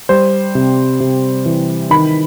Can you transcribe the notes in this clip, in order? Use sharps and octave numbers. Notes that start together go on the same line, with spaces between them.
G3 C5
C3
C3
E3
D#3 B5